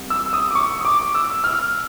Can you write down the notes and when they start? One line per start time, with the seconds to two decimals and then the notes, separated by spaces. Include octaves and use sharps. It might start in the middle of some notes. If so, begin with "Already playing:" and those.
Already playing: C2 C3
0.10 E6
0.33 D#6
0.51 D6
0.55 C#6
0.79 D#6
0.85 D6
1.15 E6
1.44 F6